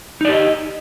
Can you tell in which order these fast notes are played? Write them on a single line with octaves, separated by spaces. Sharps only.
D#4 D5 G4 D#5